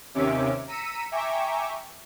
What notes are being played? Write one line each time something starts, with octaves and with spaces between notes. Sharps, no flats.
D#2 C3 C#4 E5 D6
A#5 E6 B6 C#7 D#7
E5 G5 G#5 A#5 C#6 D6